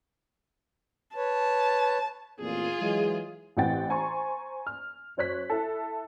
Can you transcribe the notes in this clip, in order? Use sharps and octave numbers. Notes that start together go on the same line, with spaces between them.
B4 C#5 A5
A1 F2 A#2 F4 G#4
E3 F#3 G#3
A1 E3 C4 F#5 G5 A6
C5 G#5 A#5 C6 C#6
F6
F#2 C5 C#5 F#6 B6
E4 A4